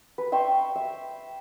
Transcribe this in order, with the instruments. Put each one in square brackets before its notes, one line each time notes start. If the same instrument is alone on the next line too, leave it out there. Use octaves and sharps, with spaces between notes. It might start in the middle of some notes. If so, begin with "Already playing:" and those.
[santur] B4
E5 G5 C6 C#6
E5